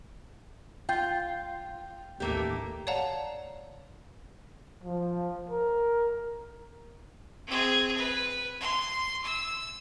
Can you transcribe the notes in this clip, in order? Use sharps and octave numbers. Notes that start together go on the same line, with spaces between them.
C#2 F4 G5 G6
A1 D#2 A3 A#3 G4
C#5 D5 F5 F#5 A5 A#5
F3
A#4
C4 G#4
B4
C6
E6